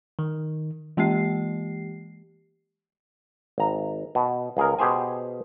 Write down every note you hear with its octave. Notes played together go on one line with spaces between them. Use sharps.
D#3
E3 G#3 A#3 G4 C7
G#1 A#5
B2
C#2 G#4 A#4
B2 G4 G#4 C5 G#5